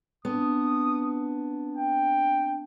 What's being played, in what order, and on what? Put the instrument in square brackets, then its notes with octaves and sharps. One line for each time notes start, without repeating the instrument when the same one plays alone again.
[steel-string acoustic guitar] B3 [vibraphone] C4 D4 A5 [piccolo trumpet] D#6
[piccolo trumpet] G5